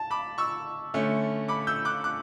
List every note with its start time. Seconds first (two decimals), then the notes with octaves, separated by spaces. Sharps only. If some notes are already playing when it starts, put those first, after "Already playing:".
Already playing: A5
0.11 B5 D6
0.38 C#6 E6
0.94 D3 A3 C#4
1.48 B5 D6
1.67 E6 G6
1.85 D6 F#6
2.04 D6 F#6